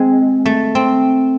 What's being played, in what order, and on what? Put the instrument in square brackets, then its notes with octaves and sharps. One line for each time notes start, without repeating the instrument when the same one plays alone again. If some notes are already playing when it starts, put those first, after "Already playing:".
Already playing: [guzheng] G#3 C4
A3
C4